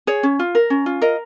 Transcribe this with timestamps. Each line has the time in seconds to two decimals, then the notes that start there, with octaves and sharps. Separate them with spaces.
0.07 G#4 C#5
0.23 C#4
0.39 F4
0.55 A#4
0.70 C#4
0.86 F4
1.02 A#4 D#5